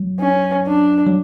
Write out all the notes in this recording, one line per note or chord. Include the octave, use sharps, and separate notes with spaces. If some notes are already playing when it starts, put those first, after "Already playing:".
Already playing: F#3
C#4
D4
F#3